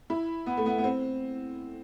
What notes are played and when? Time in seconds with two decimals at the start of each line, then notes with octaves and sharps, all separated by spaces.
0.10 E4
0.46 B3
0.57 A3
0.66 B3
0.78 B3
0.84 C4